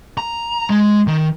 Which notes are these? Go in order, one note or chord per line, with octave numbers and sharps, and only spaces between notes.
A#5
G#3
D#3